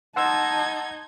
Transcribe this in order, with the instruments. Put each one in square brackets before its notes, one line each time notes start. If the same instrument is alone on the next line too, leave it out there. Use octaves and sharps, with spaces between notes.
[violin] D#4 G#6 [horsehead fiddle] D#5 A5 [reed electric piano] F#5 C6 E6